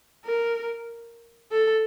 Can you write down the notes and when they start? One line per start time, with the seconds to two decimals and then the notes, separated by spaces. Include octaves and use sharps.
0.25 A#4
1.51 A4